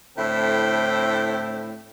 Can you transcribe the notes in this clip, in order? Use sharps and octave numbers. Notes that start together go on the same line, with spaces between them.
A2 D3 C4 E4 A4 G5